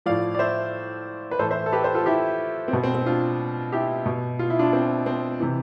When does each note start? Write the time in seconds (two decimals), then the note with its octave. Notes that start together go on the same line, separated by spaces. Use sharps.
0.06 A2 F3 D5 F5
0.34 D5
0.39 C5 E5
1.31 B4
1.39 A2 E3 A4 C5
1.50 C5 E5
1.66 A4
1.72 G4 B4
1.83 A4 C5
1.95 F4 A4
2.06 E4 G4
2.68 C4
2.73 B2 B3
2.84 C4
2.95 C4
3.06 D4 F4
3.72 E4 G4
4.06 B2
4.39 F4
4.50 E4
4.59 D4 F4
4.73 C4
5.06 C4
5.40 C3 E3